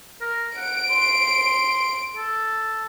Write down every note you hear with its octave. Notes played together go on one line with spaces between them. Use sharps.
A#4
F#5 D7
C6
A4